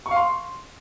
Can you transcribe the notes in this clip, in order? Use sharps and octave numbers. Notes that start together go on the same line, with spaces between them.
C#6
F5
C6